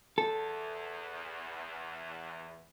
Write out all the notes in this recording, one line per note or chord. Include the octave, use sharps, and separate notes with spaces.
E2 A4